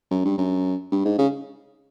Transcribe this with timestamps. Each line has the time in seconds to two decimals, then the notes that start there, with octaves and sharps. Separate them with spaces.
0.11 F#2
0.25 G2
0.38 F#2
0.92 G2
1.05 G#2
1.18 C#3